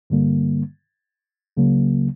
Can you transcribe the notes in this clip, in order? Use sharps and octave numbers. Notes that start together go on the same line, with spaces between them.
G2 D3 G3 A#3
C#2 C#3 F#3 A#3